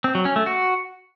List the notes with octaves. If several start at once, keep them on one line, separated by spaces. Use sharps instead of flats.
C4
F#3
C#4
A3
F#4